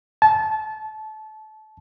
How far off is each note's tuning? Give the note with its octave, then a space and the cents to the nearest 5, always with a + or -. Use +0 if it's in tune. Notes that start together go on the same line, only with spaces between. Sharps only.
A5 -25